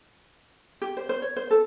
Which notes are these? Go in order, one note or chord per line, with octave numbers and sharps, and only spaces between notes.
G4
C5
C5
C#5
C5
A4